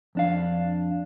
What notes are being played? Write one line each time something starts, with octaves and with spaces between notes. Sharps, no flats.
F2 D4 F5